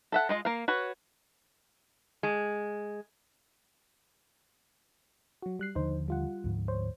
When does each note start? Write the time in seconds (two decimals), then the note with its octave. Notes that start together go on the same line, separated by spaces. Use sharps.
0.12 A4 E5 F#5
0.29 G#3 F4 D#5
0.45 A#3 F5
0.68 F#4 B4 C#5
2.23 G#3
5.42 F#3 F#4
5.59 G3 F#6 C7
5.75 D#2 D3 F3 D#4 C5
6.08 G3 F4 F#5
6.44 D2 G#2 F3
6.68 C5 C#5